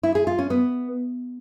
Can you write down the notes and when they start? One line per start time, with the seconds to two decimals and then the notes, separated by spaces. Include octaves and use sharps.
0.03 E4
0.15 G#4
0.27 F4
0.39 C#4
0.50 B3